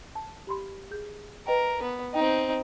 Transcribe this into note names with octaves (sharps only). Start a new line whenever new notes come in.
A5
G4 B5 C6
G#4 G6
A#4 B4 D#5 G5
B3
C4 D#4 G5